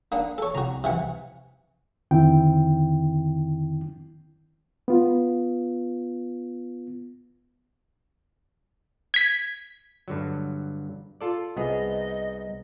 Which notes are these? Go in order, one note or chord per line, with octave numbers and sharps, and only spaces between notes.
A#3 B3 D4
A4 C#5
C2 F#4 A#5
C3 E3 F#5
F2 D3 D#3 C4 E4 G5
B3 F4
G#6 B6
G2 D3 F#3
F4 A4 D5
C2 B3 G#4 D#5